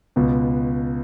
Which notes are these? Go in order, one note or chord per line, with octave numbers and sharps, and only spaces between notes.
C#2 B2 B3